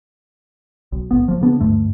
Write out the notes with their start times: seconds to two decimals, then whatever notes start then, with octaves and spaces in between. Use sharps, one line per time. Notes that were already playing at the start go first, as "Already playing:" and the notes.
0.92 B1
1.11 A1 B3
1.28 F3 A#3
1.41 C#3 B3 D4
1.61 D2 G2 A3